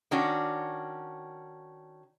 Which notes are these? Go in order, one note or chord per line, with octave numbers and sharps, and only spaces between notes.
D#3 C#4 D4 F#4